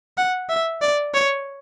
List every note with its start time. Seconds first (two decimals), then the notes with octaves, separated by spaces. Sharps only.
0.17 F#5
0.49 E5
0.81 D5
1.14 C#5